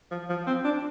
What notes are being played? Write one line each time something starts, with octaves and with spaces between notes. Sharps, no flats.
F3
F3
C4
D4